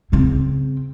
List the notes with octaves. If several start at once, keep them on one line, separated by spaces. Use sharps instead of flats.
C#3 C4